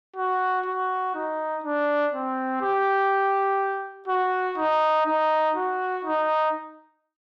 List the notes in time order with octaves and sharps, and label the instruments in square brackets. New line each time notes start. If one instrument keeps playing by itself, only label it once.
[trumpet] F#4
F#4
D#4
D4
C4
G4
F#4
D#4
D#4
F#4
D#4